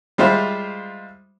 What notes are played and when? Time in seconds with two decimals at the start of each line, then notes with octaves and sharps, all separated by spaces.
0.18 G3 G#3 F4 C5 E5